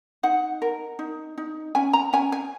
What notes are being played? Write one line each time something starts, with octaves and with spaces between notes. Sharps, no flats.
D#4 F#5
A#4
D#4
D#4
C#4 G#5
A#5
C#4 G#5
G#5